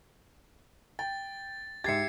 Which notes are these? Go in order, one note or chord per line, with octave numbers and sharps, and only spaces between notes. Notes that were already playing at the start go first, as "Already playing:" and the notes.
G5 A6
G#2 G4 E5 G#6 A6 C7 C#7